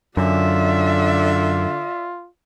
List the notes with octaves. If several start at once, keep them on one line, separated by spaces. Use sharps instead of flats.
F#2 D3 F4 D5 E5